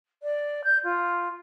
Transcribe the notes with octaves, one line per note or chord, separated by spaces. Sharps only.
D5
G6
F4